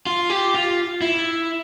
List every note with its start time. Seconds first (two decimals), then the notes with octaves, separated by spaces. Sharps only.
0.06 F4
0.30 G4
0.54 F4
1.01 E4